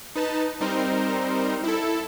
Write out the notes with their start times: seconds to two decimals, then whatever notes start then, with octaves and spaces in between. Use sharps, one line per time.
0.15 D#4 B4 A5
0.60 G3 C4 D#4 A#4 C5
1.64 E4 A4